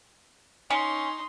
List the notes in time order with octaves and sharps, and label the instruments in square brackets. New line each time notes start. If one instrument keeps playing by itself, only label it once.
[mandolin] C#4 [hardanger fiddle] D#4 C6